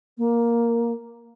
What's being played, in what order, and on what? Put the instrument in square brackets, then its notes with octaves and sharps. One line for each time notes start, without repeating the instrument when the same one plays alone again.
[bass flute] A#3